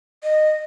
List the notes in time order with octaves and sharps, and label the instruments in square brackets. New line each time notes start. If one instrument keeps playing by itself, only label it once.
[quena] D#5